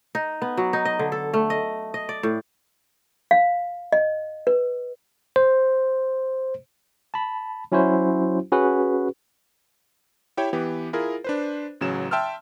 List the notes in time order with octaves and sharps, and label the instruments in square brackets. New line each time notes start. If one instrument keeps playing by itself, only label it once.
[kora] D#4
B3
F#3
D#4
D#5
D3
A4
A3
D#5
D#5
D5
A2
[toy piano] F5
D#5
B4
[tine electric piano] C5
A5 B5
F#3 C#4 E4 F#4 C5
C#4 F#4 G#4 B4
[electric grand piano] E4 G4 C#5 E5 G5
E3 B3 G4
E4 F4 G#4 A#4
D4 B4 C5
A1 C#3 F#3 E7
E5 G5 A5 C6 E6 F6